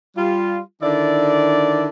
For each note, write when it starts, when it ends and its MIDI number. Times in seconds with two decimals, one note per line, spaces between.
0.17 0.59 55
0.17 0.59 65
0.82 1.88 50
0.82 1.88 51
0.82 1.88 64
0.82 1.88 74